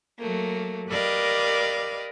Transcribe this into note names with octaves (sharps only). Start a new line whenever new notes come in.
F#3 A3 A#3
G4 A#4 B4 D5 D#5 F5